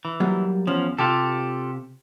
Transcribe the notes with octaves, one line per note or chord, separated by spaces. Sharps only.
E3
F#3 G3 A#3
E2 F3 C#4
C3 F4 G4 A4